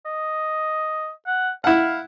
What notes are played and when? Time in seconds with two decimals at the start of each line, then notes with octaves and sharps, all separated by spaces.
0.06 D#5
1.27 F#5
1.64 E4 F5 F#5